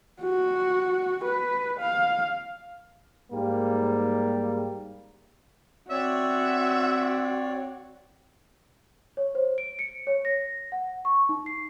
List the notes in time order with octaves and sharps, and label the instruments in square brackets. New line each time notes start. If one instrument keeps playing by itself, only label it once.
[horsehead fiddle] F#4
B4
F5
[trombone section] G#2 G3 A#3
[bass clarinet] C4 [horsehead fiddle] F#4 [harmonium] C#5 D5 [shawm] E5
[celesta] C#5
C5
D7
C#7
C#5
A#6
F#5
C#6
D#4
C7